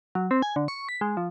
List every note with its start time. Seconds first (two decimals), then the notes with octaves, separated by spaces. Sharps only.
0.15 F#3
0.31 C4
0.42 G#5
0.56 D3
0.68 C#6
0.89 B6
1.01 G#3
1.17 F3